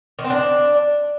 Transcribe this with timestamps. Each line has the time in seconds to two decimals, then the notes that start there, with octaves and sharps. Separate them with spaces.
0.19 D#3
0.24 C4
0.30 D4